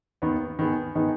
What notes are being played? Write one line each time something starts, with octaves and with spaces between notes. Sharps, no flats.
D#2 D#3 B3
D#3 B3 G#4
D#3 B3 D#4 G#4 B4